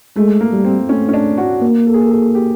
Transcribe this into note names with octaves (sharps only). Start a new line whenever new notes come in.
G#3 A3
A#3
G3
C4
A3 C#4
C#4
D4
F#4
A#3
A4
G#4
A4
G#4
G4